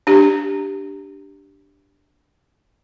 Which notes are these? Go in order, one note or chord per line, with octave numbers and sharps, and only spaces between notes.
D4 G4